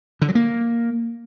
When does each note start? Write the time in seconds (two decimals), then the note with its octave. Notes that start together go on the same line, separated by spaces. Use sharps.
0.22 D3
0.28 F#3
0.35 A#3